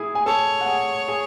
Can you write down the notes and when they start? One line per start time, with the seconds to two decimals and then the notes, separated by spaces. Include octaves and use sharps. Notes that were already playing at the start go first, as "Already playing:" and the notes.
Already playing: E4 G#4 G#5
0.15 G#5
0.26 A4 C#5 A5
0.61 F#5
0.67 G#4 G#5
1.08 G#4 G#5